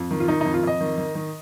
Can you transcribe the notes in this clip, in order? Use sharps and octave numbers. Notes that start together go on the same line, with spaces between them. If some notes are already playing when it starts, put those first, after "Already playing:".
Already playing: F2
D#3
F4
D#3 D#4
D#4
F2
F4
F2 D#5
D#3
D#3
D#3